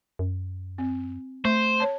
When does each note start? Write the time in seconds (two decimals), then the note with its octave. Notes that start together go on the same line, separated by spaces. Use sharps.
0.19 F#2
0.78 C4
1.45 A3 C5
1.80 C#5 A5